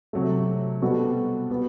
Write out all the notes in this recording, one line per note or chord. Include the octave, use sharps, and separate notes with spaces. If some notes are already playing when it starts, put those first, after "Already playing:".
C3 F#3 A3
B2 G3 C4 F#4 A4
G3 B3 F#4